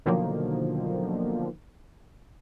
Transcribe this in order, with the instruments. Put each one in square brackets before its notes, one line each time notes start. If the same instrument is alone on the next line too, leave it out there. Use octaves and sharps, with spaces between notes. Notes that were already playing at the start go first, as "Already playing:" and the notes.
[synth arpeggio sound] B2 D3 D#3 F3 F#3 A#3